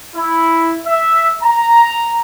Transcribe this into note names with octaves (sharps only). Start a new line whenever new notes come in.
E4
E5
A#5